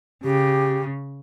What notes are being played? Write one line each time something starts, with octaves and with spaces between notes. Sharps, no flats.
C#3 G4